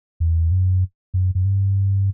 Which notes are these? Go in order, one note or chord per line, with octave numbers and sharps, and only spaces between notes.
E2
F#2
F#2
F#2
G2